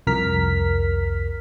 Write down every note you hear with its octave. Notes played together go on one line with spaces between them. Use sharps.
C2 F2 A#4 F6 B6